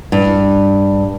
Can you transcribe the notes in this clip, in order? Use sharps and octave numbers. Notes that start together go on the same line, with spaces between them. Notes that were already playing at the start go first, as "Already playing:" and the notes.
G2